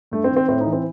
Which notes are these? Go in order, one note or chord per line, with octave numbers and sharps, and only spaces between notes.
G2 A3
C4
D#3
C4
A2 C4
D#4
E3
C4